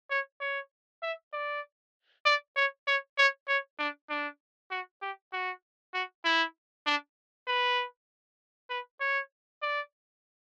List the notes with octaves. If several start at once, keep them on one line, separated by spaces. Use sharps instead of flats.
C#5
C#5
E5
D5
D5
C#5
C#5
C#5
C#5
D4
D4
F#4
G4
F#4
F#4
E4
D4
B4
B4
C#5
D5